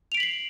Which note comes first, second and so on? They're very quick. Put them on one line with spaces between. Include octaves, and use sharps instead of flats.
F7 D7 B6 F#7 C7